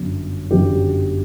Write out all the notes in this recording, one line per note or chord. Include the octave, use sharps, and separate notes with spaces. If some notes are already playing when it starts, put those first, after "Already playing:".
Already playing: G1 F#2 F#3
G1 F#2 F#3 G4